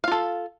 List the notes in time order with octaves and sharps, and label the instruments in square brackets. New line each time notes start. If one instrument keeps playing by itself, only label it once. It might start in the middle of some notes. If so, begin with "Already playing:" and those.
[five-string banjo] F5
F4
A4